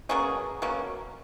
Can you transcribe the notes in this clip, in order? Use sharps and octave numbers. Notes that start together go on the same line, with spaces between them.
B2 F#3 A#3 C#4 G#4
B2 F#3 A#3 C#4